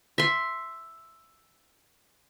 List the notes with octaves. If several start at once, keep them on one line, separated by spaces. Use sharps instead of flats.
E5 C6